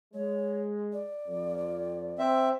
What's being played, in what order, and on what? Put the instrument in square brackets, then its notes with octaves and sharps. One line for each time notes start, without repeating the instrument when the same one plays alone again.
[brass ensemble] G#3 [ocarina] C#5
[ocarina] D5
[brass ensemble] F2
[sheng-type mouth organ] C4 E5